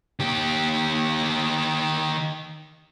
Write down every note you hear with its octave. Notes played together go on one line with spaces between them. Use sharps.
D#3 G4